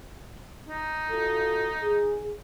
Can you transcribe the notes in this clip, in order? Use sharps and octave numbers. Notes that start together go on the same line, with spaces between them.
D#4
F4 F#4 A4
G#4